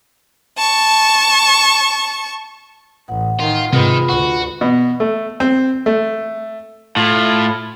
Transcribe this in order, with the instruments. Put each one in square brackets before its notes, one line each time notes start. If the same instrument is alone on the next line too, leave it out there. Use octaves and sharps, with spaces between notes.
[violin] A5 C#6
[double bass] A1 [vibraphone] F#5
[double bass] D#3 [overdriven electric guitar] F4
[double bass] G#2 G#3 [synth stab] C3 [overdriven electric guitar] D#3 [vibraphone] F4 B4 B5
[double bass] D2 [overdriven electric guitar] F#4
[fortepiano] B2
A3
C4
A3
[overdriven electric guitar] A2 [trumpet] F4